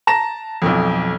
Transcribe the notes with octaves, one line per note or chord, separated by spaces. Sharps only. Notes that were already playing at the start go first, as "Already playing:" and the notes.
A5 A#5 A#6 E7
B1 F2